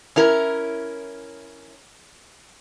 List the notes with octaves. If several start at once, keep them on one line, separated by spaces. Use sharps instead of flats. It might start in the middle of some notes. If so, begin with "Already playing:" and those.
C#4 E4 A#4